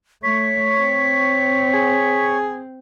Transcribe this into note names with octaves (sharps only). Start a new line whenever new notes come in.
A3 C#5 C#6 B6
C4
G#4